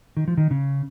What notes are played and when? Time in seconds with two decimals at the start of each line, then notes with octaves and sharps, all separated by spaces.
0.17 D#3
0.28 F3
0.37 D#3
0.51 C#3